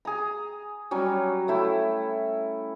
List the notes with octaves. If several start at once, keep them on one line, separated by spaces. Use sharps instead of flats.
G#4 A#5
F#3 G3 C#4
A3 E4 G5